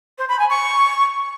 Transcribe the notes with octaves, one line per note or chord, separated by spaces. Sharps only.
C5
B5
G#5
C#6